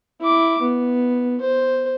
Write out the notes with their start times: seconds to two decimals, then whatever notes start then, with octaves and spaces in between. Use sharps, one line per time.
0.20 E4 D6
0.61 B3
1.41 C5